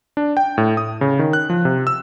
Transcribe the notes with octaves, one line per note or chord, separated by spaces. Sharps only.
D4
G5
A2
D#6
C#3
D#3
F#6
F3
C3
E6